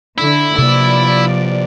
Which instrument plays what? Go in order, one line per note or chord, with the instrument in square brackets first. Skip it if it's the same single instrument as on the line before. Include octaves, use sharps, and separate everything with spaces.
[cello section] D3 [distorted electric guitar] E4
[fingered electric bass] C3 A#3 [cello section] F3 D5